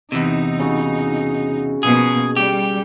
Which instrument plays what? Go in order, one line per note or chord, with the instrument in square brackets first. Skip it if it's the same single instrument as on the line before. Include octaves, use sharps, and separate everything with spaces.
[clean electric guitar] E2 C3 [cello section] D#4
[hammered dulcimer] C#3 F#4
[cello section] B2 F3 A#3 [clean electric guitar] G#4
[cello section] G3 [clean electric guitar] G4